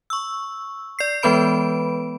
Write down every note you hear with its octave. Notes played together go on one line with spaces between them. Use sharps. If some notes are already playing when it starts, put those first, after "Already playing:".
C#6 E6
D5 C7
E3 G#3 B3 B4 B5 D7